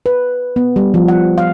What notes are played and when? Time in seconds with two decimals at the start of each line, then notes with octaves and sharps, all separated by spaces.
0.06 B4
0.56 B3
0.76 G3
0.94 F3
1.08 F#5
1.38 F5